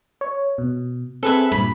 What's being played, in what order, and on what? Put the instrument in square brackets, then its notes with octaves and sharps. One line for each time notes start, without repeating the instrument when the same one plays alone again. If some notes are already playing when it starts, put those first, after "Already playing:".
[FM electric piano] C#5
B2
[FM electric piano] C4 G#4 [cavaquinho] A4 B4 E5
[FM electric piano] G2 A#2 [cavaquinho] B5